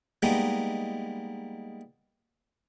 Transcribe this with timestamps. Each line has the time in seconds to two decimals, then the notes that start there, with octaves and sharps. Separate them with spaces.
0.22 G3 G#3 A#3 B3 D#4